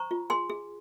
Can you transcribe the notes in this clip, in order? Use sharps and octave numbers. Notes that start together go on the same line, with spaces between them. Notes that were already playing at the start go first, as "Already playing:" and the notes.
Already playing: C5 A#5 C#6
F4
G#4 G#5 C6
G#4